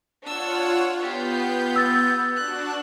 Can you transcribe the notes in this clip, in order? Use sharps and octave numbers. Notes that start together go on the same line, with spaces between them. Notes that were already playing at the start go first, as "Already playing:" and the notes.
D4 F4 C#5 F#5 E6
B3 F4 G4 G6
E6 A6
D4 F#4 A5 F#6